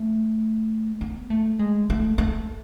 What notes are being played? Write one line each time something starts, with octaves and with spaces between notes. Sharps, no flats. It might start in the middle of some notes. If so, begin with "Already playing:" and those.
Already playing: A3
B3
A3
G#3
A3
A3